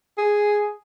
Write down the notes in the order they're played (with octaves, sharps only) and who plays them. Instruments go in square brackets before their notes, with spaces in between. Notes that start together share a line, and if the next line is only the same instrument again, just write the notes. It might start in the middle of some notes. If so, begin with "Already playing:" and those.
[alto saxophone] G#4